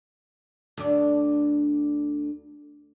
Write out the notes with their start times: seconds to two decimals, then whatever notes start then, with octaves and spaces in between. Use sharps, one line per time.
0.77 D2 D4